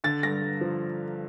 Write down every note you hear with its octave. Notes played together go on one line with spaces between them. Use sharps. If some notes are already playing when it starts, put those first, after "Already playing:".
D3 A6
G2 A#6
G2
F3